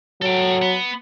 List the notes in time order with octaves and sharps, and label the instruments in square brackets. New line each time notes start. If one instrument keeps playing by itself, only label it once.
[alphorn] F#3 [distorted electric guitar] A4 G5
[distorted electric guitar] B3